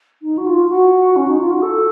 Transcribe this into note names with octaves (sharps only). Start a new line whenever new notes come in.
D#4
F#4
F4
F#4
C#4
D#4
F4
F#4
A4